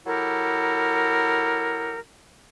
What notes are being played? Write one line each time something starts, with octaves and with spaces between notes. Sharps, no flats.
F#3 E4 G4 A4 A#4